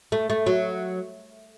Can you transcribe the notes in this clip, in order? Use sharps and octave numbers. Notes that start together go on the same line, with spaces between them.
A3
A3
F#3